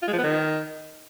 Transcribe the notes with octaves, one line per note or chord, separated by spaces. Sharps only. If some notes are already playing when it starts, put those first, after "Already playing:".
F4
G#3
F3
B3
D#3